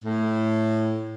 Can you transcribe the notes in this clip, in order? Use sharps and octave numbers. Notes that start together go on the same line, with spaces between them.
A2